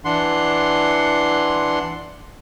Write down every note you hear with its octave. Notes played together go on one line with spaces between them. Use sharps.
E3 D4 F#5 C6